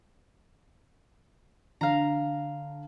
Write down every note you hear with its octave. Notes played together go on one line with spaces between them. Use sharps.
D3 F5 A#5